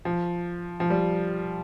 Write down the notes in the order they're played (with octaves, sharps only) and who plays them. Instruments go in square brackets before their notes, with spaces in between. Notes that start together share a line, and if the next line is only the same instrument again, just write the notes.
[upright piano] F3
F3
G3